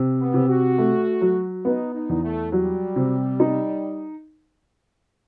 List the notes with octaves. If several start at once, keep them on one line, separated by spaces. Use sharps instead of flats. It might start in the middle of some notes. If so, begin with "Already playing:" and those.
Already playing: C3
B3
C3
F#4
A3
F#3
B3 D#4
D#4
E2
A3
F#3 G3
C3
D#4